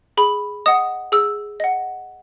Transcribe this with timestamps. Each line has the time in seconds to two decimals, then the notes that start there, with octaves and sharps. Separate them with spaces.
0.17 G#4 B5
0.66 D#5 F#5 D#6
1.12 G#4 E6
1.60 D#5 F#5